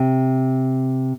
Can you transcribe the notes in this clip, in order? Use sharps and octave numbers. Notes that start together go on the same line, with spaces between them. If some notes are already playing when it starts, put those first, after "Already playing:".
Already playing: C3